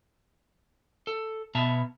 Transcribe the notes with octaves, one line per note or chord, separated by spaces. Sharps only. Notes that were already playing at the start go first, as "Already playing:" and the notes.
A4
B2 B3 E5 A5 A#5